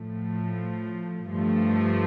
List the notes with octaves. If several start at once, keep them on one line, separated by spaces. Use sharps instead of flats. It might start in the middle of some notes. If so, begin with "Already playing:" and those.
Already playing: A2 F3 A3
G2 F3 A3